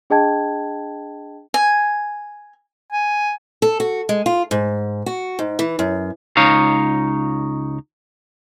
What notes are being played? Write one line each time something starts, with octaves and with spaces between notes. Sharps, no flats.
D4 G#4 D#5 G5 A5 G#6
G#5
G#5
A4
F#4
G#3
F4
G#2
F#4
G#2
E3
F#2
C#2 D#4 C#5 F5